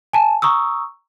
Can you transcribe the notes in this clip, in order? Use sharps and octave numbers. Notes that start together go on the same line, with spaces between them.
G#5 A5
A#5 C#6 D#6 E6